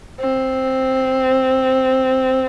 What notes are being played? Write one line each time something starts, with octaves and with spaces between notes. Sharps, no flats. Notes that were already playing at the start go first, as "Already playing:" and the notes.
C4